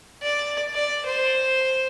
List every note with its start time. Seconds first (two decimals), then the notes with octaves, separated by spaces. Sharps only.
0.23 D5
0.73 D5
1.06 C5